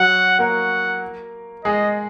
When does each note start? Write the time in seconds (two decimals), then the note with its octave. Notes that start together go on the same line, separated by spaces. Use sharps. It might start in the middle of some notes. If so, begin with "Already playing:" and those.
Already playing: F#3 F#4 F#5
0.39 A#3 A#4 F#5
1.64 G#3 G#4 D#5